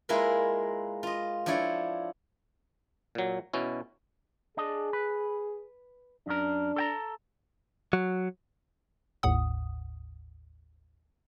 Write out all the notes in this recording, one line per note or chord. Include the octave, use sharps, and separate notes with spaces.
G#3 A#3 E4 F4 A#4 B4
F4 D#5
F3 D4 E4 C#5 D5
A#2 F#3
B2 C#4 E4
D4 G#4 D#5
B4
F#2 D4 A#4
A4 G5 A#5
F#3
G#1 D#2 A2 F#5 D#6